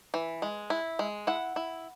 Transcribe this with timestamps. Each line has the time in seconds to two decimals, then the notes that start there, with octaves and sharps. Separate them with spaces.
0.14 E3
0.42 G#3
0.70 E4
0.99 G#3
1.27 E4 F#5
1.56 E4